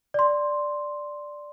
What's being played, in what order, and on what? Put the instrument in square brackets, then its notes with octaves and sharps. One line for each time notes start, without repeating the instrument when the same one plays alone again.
[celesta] D5 C6